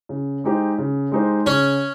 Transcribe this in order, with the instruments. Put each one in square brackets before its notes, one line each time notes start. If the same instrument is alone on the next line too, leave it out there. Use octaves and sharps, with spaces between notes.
[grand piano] C#3
G#3 D#4 G4 C5
C#3
G#3 D#4 G4 C5
[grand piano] C#3 [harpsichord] C#4